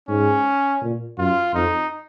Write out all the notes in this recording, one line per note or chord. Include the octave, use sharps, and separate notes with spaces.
G#2 C#4
A#2
F#2 F4
F2 D#4